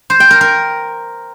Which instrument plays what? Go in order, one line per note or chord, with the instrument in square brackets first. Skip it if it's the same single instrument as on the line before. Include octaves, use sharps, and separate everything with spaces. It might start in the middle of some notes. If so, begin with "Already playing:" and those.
[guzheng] C5
G5
A#4
A#4